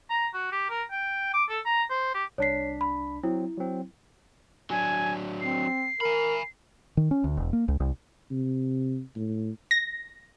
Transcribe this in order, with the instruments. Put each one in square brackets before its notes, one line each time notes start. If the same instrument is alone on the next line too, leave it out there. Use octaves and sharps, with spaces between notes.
[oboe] A#5
F#4
G4
A#4
G5
D6
A4
A#5
C5
G4
[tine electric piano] C2 D4 B6 [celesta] C#5 C7
[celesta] B5
[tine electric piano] F#3 C4 [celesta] E4
[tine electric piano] F#3 C4
[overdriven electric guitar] F#3 D4 [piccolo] G#5
[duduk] C4 [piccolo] C7
[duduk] A#4 [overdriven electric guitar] G#5 B5
[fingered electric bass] D#3
C#4
D2
E1
A#3
C#2
C2
[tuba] C3
A2
[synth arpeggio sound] A#6